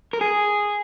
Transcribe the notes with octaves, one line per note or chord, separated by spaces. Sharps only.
A#4
G#4